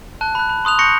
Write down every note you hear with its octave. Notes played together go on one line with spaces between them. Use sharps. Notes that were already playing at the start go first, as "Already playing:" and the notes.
A5 F#6
B5 F#6
B5
C6 D#6 F#6 F7
C6 C#6 G6 A#6 C#7